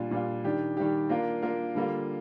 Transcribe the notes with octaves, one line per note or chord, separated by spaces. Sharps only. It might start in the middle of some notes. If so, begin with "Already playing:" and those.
Already playing: A#2 G3 D4 F4
A#2 G3 D4 F4
D#3 G3 D4 G4
D#3 G3 D4 G4
A#3 D4 F4 A#4
A#3 D4 F4 A#4
D3 G3 A#3 F4